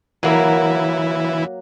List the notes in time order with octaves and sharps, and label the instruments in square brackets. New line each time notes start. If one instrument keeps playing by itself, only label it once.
[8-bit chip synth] E3 E4 [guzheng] F#3 A#3